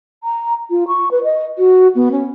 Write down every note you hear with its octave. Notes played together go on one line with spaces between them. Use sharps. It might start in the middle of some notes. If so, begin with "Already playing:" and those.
A#5
F4
C#6
B4
D#5
F#4
B3
C#4